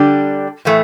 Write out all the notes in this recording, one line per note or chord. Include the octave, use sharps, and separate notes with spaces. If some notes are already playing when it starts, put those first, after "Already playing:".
Already playing: D3 G3 D4 G4
A2 E3 A3